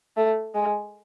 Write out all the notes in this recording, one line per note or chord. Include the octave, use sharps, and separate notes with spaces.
A3
G#3